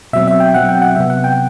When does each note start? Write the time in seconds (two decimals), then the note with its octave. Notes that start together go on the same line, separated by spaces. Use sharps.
0.13 B2 F#3 C4 E5
0.28 E5
0.40 G5
0.54 B2 F#3 C4 F#5
0.69 G5
0.82 F#5
0.96 C3 F#3 B3 E5
1.10 F#5
1.24 G5